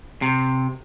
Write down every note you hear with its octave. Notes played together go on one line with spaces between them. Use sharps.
C3